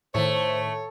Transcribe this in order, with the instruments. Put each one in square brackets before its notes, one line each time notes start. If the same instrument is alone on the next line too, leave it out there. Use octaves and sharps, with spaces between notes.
[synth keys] A2 D#3 [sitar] A3 [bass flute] C5 [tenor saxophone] C#5